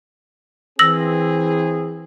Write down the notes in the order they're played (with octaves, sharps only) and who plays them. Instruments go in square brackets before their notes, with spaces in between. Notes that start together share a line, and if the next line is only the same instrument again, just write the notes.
[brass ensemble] E3 C4 G#4 [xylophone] E6 A#6 F#7